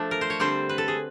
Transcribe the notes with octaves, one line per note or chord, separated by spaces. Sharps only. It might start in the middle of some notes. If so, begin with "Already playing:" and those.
Already playing: F3 A3 D4
A#4
C5
C#5
D3 G3 C4 C5
B4
A4
G#4